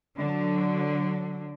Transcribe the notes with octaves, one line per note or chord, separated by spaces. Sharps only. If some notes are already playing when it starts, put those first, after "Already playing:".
D3 F#3